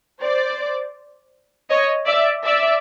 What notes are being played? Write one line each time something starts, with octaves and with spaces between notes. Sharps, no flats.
C5 D5
C#5 D#5
D5 E5
D5 E5